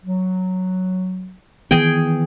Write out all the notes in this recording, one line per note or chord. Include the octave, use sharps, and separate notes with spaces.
F#3
D#3 E3 B3 G#4 G5